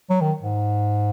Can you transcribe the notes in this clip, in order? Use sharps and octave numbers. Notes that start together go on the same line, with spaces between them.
F#3
D#3
G#2